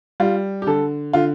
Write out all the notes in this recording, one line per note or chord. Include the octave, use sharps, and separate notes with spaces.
G3 F4
G4
D3 A4
D3 F4